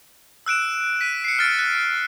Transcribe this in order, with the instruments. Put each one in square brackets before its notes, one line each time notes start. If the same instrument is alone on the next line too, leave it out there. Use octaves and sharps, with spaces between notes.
[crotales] E6 F#6 D7 E7
B6 D#7
C7 C#7
F6 A6 D7
F#6